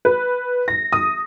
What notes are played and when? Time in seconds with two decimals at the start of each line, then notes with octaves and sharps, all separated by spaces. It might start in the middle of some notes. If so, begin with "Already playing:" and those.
0.05 B4
0.68 A#6
0.93 D#6